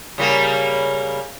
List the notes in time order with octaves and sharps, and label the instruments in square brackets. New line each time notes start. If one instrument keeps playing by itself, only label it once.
[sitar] C#3 G3 A#3